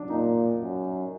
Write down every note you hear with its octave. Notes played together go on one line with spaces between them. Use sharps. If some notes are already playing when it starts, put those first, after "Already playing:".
Already playing: F#3 D4
A#2 D#4
F#2